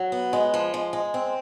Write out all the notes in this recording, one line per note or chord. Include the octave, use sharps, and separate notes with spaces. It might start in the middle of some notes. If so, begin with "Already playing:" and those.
Already playing: F#3
B3
G#3
F3
G#3
G#3
C4